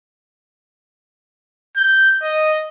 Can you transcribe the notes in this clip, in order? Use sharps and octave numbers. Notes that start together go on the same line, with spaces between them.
G6
D#5